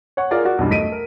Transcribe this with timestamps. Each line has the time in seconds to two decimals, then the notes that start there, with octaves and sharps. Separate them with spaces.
0.17 C#5 F#5 C#6
0.31 F4 G#4 A#4 D5 F5
0.45 F#4 D5
0.59 B1 E2 G2
0.71 A3 D#5 B6 D7 D#7
0.92 A#4